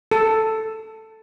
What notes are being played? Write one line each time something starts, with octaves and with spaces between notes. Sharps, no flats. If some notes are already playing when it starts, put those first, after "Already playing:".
A4